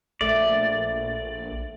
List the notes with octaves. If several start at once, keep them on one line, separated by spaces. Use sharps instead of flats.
A#1 A3 D5